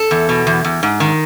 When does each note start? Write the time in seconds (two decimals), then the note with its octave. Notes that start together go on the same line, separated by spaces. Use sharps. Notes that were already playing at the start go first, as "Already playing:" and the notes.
Already playing: A4
0.11 E2
0.29 B2
0.47 E2
0.64 E2
0.83 G#2
1.00 D#3